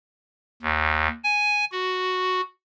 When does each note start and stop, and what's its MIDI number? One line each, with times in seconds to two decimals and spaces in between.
0.62 1.08 39
1.24 1.65 80
1.72 2.41 66